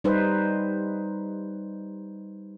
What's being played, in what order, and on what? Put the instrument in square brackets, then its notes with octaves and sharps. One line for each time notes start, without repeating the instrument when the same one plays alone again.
[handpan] G3 D#4 B4 C5